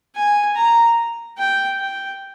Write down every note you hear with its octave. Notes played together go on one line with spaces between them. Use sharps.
G#5
A#5
G5
G5